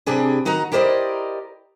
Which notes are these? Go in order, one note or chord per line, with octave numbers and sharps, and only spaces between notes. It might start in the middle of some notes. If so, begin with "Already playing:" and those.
C3 D4 G4 G#4 B4
D#3 D#4 F#4 F#5 A#5
E4 G4 A#4 C5 D5 D#5